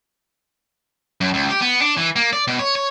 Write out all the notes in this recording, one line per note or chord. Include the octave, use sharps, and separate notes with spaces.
F#2
C#2
G4
B3
D4
E3
A#3
D5
B2
C#5
C#5